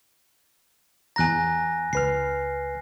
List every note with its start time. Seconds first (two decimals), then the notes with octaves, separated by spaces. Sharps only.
1.16 E2 G#5 A#5 F#6 A#6
1.93 C#2 B4 F6 C7